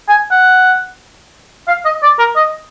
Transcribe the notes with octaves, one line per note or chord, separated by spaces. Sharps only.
G#5
F#5
F5
D#5
D5
A#4
D#5